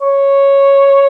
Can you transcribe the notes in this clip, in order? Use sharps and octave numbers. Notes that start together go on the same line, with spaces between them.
C#5